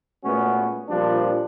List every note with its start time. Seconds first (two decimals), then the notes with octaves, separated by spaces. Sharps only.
0.24 A#2 G#3 A3 B3 C#4 F#4
0.89 A#2 F3 G3 C4 D4